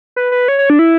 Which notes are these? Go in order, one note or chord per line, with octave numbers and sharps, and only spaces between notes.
B4
B4
C#5
C#5
D4
E4